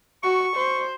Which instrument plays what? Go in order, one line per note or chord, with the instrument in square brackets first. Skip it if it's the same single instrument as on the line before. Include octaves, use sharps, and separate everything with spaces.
[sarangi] F#4 [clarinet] C#6
[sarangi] C5